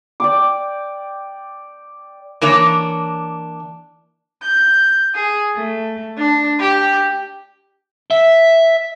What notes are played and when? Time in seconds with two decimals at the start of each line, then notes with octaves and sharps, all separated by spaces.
0.20 D5 G5 D6
2.41 E3 A#3 D4 C#5
4.42 G6
5.15 G#4
5.55 A3
6.16 D4
6.60 G4
8.11 E5